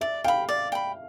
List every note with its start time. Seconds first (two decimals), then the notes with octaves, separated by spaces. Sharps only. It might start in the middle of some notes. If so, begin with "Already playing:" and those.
0.01 D5 E5
0.24 F5 G5 B5
0.49 D5
0.72 G5 B5